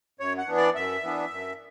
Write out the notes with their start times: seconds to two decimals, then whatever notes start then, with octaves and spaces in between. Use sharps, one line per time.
0.20 F#2 C#5
0.38 F#5
0.47 E3 B3 D4
0.57 D5
0.75 F#2 E5
1.03 E3 B3 D4
1.30 F#2